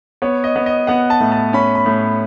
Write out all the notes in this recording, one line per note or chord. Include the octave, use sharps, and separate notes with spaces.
B3 C#5
D#5
B3
D#5
B3 F#5
A5
A2
A5
C#4 B5
B5
A2